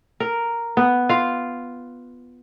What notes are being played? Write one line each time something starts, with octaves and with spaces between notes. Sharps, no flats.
A#4
B3
F4 F5